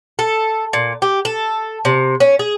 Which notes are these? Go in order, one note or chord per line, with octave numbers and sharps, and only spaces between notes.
A4
A#2
G4
A4
C3
C#4
G#4